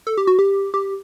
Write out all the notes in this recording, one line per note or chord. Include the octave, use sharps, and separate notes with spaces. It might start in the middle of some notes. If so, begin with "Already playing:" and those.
A4
G4
F#4
G4
G4